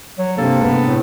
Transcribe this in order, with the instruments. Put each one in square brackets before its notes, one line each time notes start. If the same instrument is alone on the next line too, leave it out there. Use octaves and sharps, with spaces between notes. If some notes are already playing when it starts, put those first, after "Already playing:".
[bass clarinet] F#3
[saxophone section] G2 A4 [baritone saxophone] C3 [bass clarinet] A#3
[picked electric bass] C3 G#3 [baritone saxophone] B3
[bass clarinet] A2